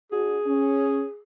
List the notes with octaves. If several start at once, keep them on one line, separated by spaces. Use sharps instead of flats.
D4 F#4 G#4
C#4